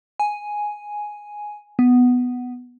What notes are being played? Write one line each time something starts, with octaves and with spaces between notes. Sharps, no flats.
G#5
B3